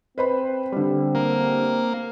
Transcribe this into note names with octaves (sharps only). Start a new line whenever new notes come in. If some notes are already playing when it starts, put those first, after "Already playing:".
C4 B4 C5 B5
D3 G3
A#3